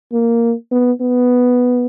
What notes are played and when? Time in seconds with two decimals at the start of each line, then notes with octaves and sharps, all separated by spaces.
0.13 A#3
0.72 B3
1.01 B3